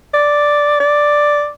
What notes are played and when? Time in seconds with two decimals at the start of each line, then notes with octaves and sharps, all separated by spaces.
0.14 D5
0.80 D5